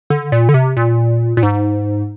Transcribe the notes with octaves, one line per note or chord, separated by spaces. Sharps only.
D3
A#2
D3
C3
A#2
A#2
G#2